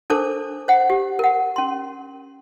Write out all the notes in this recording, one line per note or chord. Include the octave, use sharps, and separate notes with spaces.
D4 A4 A#4 C5 A5 D6
C5 F#5
G4
A#4 F#5
C#4 C6